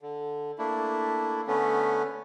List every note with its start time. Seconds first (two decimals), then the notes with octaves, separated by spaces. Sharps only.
0.02 D3
0.58 A3 A#3 D4 E4
1.47 D3 A3 B3 C#4